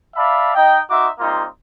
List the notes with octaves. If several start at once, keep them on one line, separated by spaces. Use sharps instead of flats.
D5 E5 F5 A5 B5
D#4 D#5 G5
D#4 F#4 E5 C6 D6
G3 A#3 C4 D#4 F4